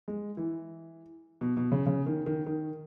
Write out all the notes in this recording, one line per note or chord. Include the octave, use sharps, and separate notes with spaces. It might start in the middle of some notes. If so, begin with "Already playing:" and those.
G#3
E3
B2
B2
C#3
C#3
D#3
D#3
D#3